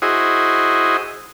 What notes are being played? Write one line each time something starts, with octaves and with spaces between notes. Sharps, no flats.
E4 F#4 G#4 C5 D#5